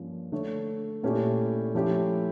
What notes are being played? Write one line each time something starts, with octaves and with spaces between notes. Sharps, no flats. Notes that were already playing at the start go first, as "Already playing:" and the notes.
Already playing: G2 F3 A#3 C#4
D3 A3 D4 A4 C#5
A#2 A3 C#4 E4 G4
F3 A3 C#4 E4 G4